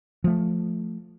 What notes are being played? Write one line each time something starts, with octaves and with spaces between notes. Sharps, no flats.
F3 A3